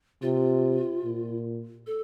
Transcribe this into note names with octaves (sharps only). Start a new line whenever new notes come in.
C3 F4
A#2
A4